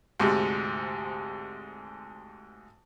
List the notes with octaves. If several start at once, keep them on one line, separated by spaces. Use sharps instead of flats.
D2 G#2 C3